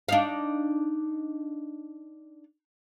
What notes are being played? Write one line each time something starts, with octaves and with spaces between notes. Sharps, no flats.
D4 D#4 F5